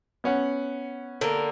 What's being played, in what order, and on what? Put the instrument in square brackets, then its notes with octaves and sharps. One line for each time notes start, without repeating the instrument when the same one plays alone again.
[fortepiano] B3 C#4 F#5
[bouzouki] D3 A#3